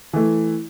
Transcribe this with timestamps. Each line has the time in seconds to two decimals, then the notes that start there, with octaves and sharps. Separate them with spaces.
0.13 E3 A3